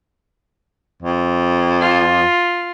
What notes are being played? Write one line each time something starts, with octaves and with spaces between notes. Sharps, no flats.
F2
F4